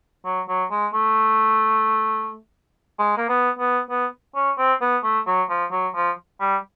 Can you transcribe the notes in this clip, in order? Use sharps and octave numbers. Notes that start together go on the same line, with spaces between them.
F#3
F#3
G#3
A3
G#3
A#3
B3
B3
B3
C#4
C4
B3
A3
F#3
F3
F#3
F3
G3